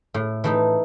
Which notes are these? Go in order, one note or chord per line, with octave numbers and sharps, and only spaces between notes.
A2
E3 A3 D#4